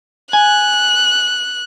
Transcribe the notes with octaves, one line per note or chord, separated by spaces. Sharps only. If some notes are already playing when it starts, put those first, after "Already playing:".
G#5 F#6